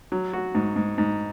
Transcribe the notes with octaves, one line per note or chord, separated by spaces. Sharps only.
F#3
F#4
G#2
G#2
G#2